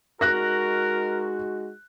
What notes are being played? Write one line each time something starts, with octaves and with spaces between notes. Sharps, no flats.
G#3 D#4 F#4 A#4 F#6 A#6